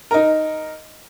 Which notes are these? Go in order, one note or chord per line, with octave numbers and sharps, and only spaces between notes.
D#4 A#4